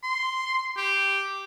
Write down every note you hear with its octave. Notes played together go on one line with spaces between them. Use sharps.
C6
G4